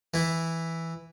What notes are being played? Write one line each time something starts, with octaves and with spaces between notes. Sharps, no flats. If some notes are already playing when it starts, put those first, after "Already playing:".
E3 E4